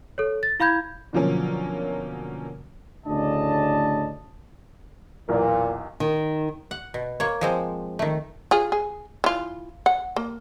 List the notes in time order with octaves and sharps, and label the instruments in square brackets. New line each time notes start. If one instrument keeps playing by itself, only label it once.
[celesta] A4 C#5
A6
E4 F5 B5 G6 G#6
[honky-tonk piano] B2 D3 F3 F#3 A#3 C#4
[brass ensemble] D2 A2 C#3 D4 D#5 A5
[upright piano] B1 E2 A#4 [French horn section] A#2
[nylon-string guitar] D#3
[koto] F#5
B2
A#3 C#5
F3 G#3 C4
D#3 A3
[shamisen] F4 G#4
G#4
E3 F4
F#5
A#3